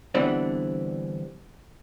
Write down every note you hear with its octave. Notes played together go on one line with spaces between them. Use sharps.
D3 E3 G3 B3 C4 D4